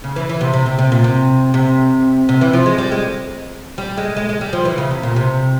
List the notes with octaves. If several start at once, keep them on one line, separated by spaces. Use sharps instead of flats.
C#3
E3
E3
C3
C3
C3
C3
A#2
C3
C3
C3
E3
F3
G#3
G3
G#3
G3
G#3
G#3
G#3
G3
F3
E3
C#3
C3
A#2
C3